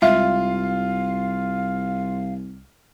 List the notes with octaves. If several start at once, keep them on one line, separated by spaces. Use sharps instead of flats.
C2 G#3 F4 E5 F5